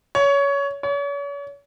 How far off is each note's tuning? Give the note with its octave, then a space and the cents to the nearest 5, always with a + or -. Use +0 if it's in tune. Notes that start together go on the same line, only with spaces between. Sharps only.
C#5 +20
C#5 +40